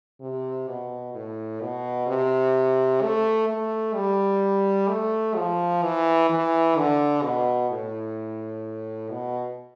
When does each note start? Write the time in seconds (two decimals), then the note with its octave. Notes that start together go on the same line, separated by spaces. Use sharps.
0.21 C3
0.68 B2
1.15 A2
1.62 B2
2.07 C3
3.02 A3
3.48 A3
3.95 G3
4.89 A3
5.36 F3
5.83 E3
6.30 E3
6.77 D3
7.23 B2
7.70 A2
9.10 B2